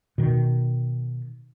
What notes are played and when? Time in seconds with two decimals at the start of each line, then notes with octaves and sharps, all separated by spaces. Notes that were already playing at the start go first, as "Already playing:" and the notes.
0.18 B2 D#3